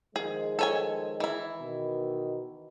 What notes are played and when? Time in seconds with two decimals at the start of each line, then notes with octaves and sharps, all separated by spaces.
0.16 D#3 F3 G#3 G#4
0.59 A4 C#5 G#5
1.20 E3 E4
1.61 B2 D#3